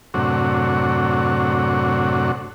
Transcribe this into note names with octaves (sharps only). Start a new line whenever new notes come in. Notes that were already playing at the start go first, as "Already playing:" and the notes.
F#2 A2 C3 D4 F#4 C#5